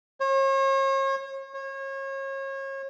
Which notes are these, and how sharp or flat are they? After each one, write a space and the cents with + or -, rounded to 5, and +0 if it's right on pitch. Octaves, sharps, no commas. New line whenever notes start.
C#5 -40
C#5 -35